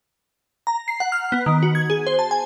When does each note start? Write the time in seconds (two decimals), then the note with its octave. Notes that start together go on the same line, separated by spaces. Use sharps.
0.67 A#5
0.88 C7
1.00 F#5
1.12 F6
1.32 B3
1.46 D#3
1.63 F#4
1.75 G#6
1.90 G#4
2.07 C5
2.19 A5
2.31 G#5